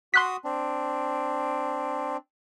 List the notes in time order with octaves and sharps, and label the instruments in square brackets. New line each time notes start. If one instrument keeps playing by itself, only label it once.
[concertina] F#4 D#6 [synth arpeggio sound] C6 F#6 B6
[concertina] C4 D4